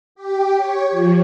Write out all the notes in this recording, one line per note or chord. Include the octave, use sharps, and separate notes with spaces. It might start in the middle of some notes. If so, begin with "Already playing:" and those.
G4
C#5
F3